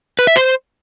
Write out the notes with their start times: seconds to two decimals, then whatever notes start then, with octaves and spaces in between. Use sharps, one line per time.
0.19 B4
0.27 E5
0.36 C5